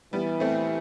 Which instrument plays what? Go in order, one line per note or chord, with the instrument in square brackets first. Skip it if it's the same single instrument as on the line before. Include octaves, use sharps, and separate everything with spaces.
[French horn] E3 [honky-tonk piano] G3 B3
[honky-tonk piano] A3 C4